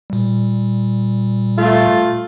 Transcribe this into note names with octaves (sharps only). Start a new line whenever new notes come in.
A#2 G3
A3 F4